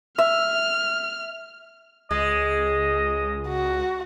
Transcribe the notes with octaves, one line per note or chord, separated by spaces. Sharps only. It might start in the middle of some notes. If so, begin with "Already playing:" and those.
E5 F6
C#2 G#3 D#5
F#4